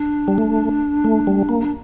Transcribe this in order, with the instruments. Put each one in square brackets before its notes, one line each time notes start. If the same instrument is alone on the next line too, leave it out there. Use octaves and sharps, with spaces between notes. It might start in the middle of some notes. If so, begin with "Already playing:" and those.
Already playing: [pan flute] D4
[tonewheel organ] G3
A3
A3
G3
A#3
[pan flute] D4